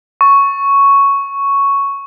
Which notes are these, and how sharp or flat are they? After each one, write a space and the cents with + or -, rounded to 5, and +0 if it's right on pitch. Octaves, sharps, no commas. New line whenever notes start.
C#6 +0